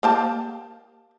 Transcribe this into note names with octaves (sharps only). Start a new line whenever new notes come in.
A#3 G4 A5